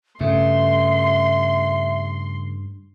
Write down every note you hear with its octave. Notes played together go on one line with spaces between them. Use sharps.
G2 C#3 A3 E5 C6